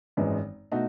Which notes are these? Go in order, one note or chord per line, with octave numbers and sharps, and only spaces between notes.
G#1 F#2 E3 G#3
B2 A3 D#4 F#4